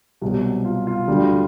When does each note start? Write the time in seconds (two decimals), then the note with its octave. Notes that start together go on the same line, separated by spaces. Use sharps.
0.21 C2 B2 F#3
0.65 F4
0.87 F4
1.08 D2 D3 G3